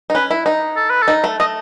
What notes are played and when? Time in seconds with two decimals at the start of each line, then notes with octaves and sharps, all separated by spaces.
0.10 D#4
0.15 C#4 B4
0.31 E4
0.46 D#4
0.77 A4
0.90 B4
1.02 A4
1.08 D#4
1.24 A3
1.40 A3 D#5